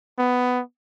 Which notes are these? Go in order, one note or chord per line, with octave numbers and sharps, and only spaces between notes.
B3